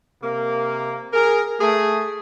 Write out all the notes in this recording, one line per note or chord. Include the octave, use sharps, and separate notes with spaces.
C3 A#3
G#4 A#4
A3 G#4